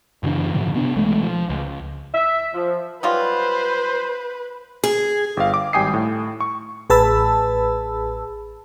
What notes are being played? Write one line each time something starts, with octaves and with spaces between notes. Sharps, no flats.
F#2 C#3 E3 D4
G#2 B2 D3 F3
C3 B3 D4
B1 E3 G#3 A3
F3
C#2
E5
F3
F#3 G3 F4 B4 C5
G#4
G1 F5
D6
G#1 G3 G5 G#5 D#6 C7
A2
C#6
A1 G#4 B4 A5 B5 E6